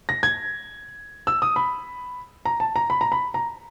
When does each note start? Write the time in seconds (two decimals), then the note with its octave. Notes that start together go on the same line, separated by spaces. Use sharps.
0.09 A#6
0.23 G#6
1.27 E6
1.42 D#6
1.56 B5
2.45 A#5
2.60 A5
2.76 A#5
2.90 B5
3.01 A#5
3.12 B5
3.34 A#5